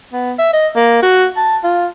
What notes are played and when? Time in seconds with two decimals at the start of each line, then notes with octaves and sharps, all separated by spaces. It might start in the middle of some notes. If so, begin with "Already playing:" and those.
0.13 B3
0.39 E5
0.53 D#5
0.76 A#3
1.03 F#4
1.37 A5
1.64 F4